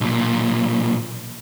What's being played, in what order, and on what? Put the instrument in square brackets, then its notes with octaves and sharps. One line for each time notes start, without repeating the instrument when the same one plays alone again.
[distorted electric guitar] B1 A#2